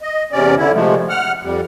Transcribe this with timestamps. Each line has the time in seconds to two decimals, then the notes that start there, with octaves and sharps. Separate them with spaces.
0.01 D#5
0.32 E2 C3 C#4 D5
0.57 D3 E4
0.73 C3 F3 G#3 A3
1.09 F#5 F6
1.42 F2 G3